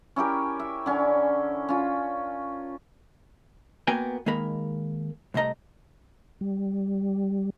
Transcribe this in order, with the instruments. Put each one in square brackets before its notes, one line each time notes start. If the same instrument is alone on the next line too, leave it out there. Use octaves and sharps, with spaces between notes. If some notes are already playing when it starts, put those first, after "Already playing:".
[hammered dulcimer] C#4 E4 G4 A#4
E5
D3 C#4 G#5
C#4 F4
[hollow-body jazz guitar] A#3 B3 F#4 A#4 G5 G#5
D#3 G#3 A#3 A#4 B5
C2 C3 A3 D#5 A#5
[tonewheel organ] G3